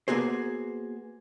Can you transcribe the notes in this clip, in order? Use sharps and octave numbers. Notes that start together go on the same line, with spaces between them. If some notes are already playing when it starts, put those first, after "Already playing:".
A#3 B3 F#4 G#4 C5